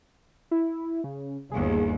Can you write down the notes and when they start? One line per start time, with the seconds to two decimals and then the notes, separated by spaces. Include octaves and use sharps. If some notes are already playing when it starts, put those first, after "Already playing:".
0.51 E4
1.04 C#3
1.51 G1 D#2 G#4